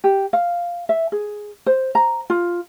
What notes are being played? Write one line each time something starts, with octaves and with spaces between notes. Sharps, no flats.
G4
F5
E5
G#4
C5
A#5
F4